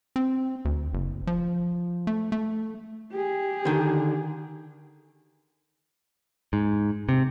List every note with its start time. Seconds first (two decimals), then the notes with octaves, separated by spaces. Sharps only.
0.16 C4
0.65 D2
0.94 F#1
1.27 F3
2.07 A3
2.32 A3
3.12 G4 G#4
3.65 D3 D#3
6.53 G#2
7.09 C3